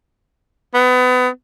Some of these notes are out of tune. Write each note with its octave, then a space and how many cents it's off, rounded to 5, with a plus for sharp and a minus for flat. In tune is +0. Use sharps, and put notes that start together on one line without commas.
B3 +30